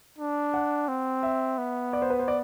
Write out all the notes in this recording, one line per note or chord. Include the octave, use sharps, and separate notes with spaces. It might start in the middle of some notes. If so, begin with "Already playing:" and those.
D4
F#5
C4
E5
B3
D5
C5
B4
C5
D5